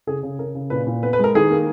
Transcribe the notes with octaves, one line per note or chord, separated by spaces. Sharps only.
C#3 G#4
C#3
C#3 A#4
C#3
A#2 B4
A#2
B3 B4
B4
G#3 A#4
D#3 G#4
A#3